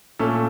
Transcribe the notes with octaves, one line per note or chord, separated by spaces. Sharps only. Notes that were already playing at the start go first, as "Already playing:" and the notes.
A#2 A3 C#4 A4